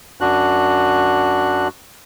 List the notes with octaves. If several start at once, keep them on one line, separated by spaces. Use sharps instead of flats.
F#2 D4 F#4 F#6